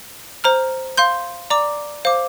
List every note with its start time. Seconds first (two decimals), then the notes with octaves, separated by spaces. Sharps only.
0.44 C5 A#5 F6
0.97 F5 C6 G6
1.50 D5 A#5 D6
2.05 C5 F5 D6